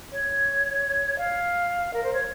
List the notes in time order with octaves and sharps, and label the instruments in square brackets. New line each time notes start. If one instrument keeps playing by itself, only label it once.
[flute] C#5
F5
A#4
C5
C#5